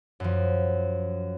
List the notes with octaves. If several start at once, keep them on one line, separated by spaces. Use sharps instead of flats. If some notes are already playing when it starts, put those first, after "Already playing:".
F#2 F3